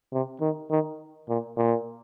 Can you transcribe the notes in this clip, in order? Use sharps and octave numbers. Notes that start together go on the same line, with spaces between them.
C3
D#3
D#3
A#2
A#2